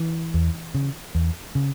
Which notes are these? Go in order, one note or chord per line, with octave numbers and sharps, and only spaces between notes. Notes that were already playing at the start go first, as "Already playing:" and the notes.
Already playing: E3
E2
C#3
E2
C#3